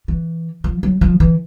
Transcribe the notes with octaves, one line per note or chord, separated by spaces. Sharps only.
E3
F3
F#3
F3
E3